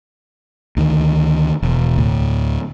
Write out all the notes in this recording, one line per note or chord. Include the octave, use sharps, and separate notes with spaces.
D2 D#3
E1
D2 A2